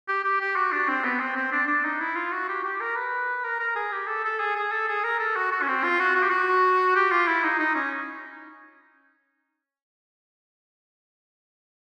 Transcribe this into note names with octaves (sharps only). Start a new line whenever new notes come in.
G4
G4
G4
F#4
D4
C4
B3
C4
C4
D4
D4
D#4
E4
F4
F#4
G4
G4
A#4
B4
A#4
A#4
G#4
G4
A4
A4
G#4
G#4
A4
G#4
A#4
A4
F#4
F#4
C#4
C4
F4
F#4
F#4
G4
F#4
G4
F4
E4
D#4
D#4
C#4